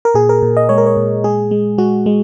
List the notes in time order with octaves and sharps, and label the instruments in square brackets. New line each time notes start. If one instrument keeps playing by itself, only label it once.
[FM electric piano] A#4
A#2 G#4
A#4
A#2
D#5
G#3 C#5
A#4
C#5
A#2
G#3 G#4
G#3
G#3 F#4
G#3